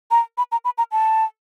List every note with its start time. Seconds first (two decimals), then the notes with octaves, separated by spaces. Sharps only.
0.11 A#5
0.38 B5
0.52 A#5
0.65 B5
0.78 A#5
0.92 A5